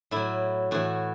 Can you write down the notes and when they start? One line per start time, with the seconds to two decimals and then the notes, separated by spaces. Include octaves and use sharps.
0.11 A2 F#3 E4
0.71 A2 E3 F#4